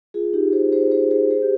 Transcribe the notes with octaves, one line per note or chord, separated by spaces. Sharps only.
F4 G#4
D#4 G4
G#4 C5
G#4 C5
G#4 C5
G#4 C5
G#4 C5
G4